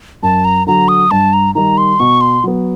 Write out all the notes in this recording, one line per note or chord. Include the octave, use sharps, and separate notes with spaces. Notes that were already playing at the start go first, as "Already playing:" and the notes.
F#2 A5
A#5
D3 F#3 A#5
D#6
G2 A5
A#5
D#3 G3 A#5
C6
B2 C#6
C6
F#3 B3